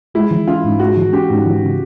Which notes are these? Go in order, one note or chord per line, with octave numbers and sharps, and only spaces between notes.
G#3 E4
E3
C#4 F4
G#2
G#3 F#4
E3
C#4 G4
G#2
E3
C#3